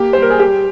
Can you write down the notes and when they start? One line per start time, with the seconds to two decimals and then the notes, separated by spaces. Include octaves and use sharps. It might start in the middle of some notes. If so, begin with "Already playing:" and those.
Already playing: A#3 G4
0.13 G3 C5
0.22 A#4
0.30 G#4
0.40 G3 G4